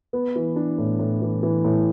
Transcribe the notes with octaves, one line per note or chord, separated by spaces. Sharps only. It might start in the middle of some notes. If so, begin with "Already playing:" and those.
B3
E3
D4
A2
A2
E3
E3
A2